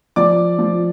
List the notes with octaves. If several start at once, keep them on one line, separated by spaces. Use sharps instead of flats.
F3 D5 D6
F3